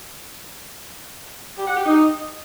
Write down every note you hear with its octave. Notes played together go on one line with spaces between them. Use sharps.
G4
F#5
G4
D#4